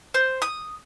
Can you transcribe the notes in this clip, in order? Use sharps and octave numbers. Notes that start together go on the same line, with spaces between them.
C5
D#6